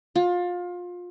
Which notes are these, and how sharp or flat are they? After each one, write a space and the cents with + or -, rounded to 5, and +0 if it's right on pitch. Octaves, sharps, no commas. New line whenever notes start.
F4 +25